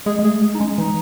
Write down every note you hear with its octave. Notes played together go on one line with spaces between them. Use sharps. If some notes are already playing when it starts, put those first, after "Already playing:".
G#3 G#4
G#3
A3 G#4
G#3 G#4
D#4
G#3 C#4
E3 D#4